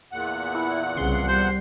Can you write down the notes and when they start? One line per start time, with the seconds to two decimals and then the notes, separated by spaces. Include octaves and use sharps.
0.12 E2 A#2 F#5
0.55 E4
0.97 C2 C#3 C6
1.28 G3 C5